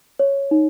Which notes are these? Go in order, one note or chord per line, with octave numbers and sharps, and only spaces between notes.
C#5
D#4